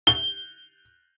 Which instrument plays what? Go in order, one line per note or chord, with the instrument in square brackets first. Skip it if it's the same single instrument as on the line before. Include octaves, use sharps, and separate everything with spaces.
[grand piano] G7